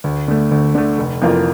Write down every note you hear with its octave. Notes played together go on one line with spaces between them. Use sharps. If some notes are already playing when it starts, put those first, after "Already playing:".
D2
D3 A3
D2
D3 A3
F1
F2 E3 A#3 F4